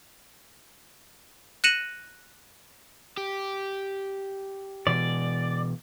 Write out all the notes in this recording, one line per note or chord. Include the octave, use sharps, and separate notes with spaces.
F#6 A#6 C#7 D#7 E7 F#7
G4
B2 E3 D5